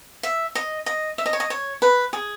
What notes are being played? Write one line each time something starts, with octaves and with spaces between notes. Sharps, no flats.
E5
D#5
D#5
E5
D#5
C#5
D#5
C#5
B4
G#4